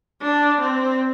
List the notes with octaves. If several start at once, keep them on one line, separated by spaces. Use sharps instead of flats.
D4
C4